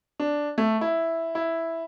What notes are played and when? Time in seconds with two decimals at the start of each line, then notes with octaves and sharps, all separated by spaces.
0.20 D4
0.58 A3
0.81 E4
1.35 E4